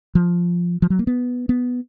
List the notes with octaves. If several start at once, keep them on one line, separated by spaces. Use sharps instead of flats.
F3
F3
F#3
A#3
B3
B3